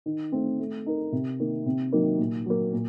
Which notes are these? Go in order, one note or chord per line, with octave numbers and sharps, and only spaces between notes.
D#3
A3 C4
A3
D#4 A#4
C3
D#3 A#3
C3
D#3 F#3 A#3
A#2
F#3 A#3
A#2